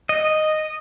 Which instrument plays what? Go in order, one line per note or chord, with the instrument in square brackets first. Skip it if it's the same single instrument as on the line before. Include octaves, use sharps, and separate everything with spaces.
[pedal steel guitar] D#5